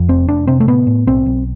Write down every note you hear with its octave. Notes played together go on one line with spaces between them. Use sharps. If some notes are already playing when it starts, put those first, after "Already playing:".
Already playing: F2
F1 C4
F1 D4
C3 C4
A3
A2 B3
A2
B1 C4
B1